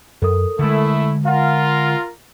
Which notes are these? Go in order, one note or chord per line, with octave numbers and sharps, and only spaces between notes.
F#2 A4 A#4 D#6
D3 G#3 A3 E4
F4 A#4 F5 F#5